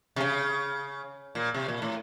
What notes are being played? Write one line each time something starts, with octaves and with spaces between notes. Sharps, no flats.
C3
C#3
A#2
C3
A#2
A2